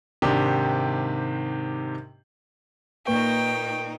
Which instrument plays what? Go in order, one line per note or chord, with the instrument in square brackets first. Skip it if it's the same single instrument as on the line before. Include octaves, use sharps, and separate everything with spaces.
[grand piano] G#2 C3 D#3 D4 G4
[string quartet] A#2 D#3 D#4 [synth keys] A#3 B4 C#6 [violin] G5